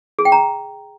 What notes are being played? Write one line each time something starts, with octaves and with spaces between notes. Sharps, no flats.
G#4
G5
A#5